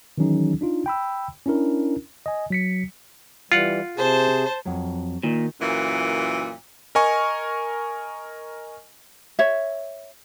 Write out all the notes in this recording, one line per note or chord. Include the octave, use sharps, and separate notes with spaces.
D#3 E3 F#3 C#4 D#4 G#4
D4 D#4 F4
G5 B5 E6
C#4 D4 E4 A#4
D#5 G#5
F#3 B6 C#7
E3 G3 F4 F#5
C3 G#4 C5 A5
F2 F#3
A#2 D#3
F#2 A#2 E3
A#4 D#5 G#5 C#6
C#5 E5